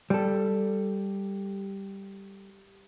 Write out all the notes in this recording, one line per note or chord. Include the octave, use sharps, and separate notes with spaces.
G3 A4